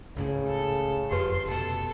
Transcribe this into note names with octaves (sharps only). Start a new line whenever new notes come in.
G#1 C#2 A2 C#3
A4
F#1 F2 F3 G4 B4 C6
F1 B2 A4